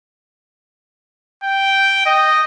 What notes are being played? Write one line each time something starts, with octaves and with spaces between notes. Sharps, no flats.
G5
D#5